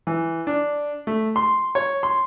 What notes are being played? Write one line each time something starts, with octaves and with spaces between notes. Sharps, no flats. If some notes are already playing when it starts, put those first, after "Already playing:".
E3
D4
A3
C6
C#5
C6